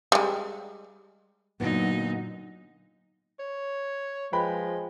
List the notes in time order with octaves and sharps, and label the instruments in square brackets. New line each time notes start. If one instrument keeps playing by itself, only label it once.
[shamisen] G3 G#3
[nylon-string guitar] A#2 D3 B3 [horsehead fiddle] F#3 [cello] D#4
[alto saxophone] C#5
[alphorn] F3 [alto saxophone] G#3 [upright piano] B4 G5 B5